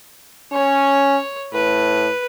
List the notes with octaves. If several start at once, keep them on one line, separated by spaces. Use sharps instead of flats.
C#4 C#5
A2 B4